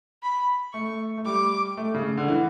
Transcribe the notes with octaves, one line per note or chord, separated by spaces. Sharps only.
B5
A3 C#6
A3
G3 D6
A3
C#3
D3
E3